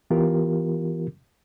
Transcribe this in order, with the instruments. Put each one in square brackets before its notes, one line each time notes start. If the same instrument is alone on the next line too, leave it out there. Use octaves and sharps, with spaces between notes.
[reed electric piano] E3 B3 F4 G4 A#4